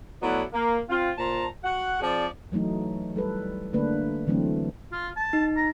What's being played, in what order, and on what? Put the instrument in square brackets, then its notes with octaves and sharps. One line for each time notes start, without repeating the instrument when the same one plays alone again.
[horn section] F#3 A3 B3 E4 D5
A#3
C4 F4
A#2 C5 A5 A#5
F#4 F#5
F3 C4 G#4 D5
[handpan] E3 F#3 A3 D#4
G3 A4 B4
D3 A3 A#3 D4 B4
D3 E3 F#3 A3 C4
[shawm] F4
A5
[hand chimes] D#4
[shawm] A#5